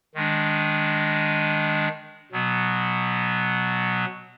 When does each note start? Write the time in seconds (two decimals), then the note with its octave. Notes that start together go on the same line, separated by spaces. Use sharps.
0.15 D#3 G#3 D4
2.32 B2 F#3 B3